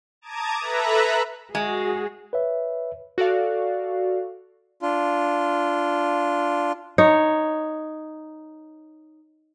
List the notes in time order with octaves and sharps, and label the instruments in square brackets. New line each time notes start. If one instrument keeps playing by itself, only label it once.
[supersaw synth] A5 A#5 D6 D#6 G#6
A4 B4 E5 A#5 B5 F#6
[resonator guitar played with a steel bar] G#3 [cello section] F#4 G#4
[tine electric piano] B4 C#5 E5
[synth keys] F#4 A4 D5 F5
[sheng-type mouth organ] D4 F4
[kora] D#4 C#5